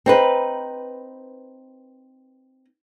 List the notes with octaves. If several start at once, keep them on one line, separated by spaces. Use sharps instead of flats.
C4 D#4 B4